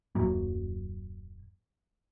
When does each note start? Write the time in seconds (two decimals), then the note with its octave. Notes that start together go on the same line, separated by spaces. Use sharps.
0.15 D#1 F#2 F#3 A#3